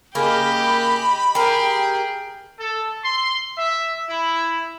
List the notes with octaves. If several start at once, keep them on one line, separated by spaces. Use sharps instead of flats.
C#3 A#3 G4 D#5 B5
G4 G#4 A#4 G5
A4
C6
E5
E4